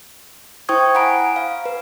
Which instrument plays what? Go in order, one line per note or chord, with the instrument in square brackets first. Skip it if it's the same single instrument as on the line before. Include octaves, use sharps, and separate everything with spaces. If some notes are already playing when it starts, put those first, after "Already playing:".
[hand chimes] E4 C5 G5 C#6 D#6 G#6
F#5 G#5 A#5 B5 D7
F5
B4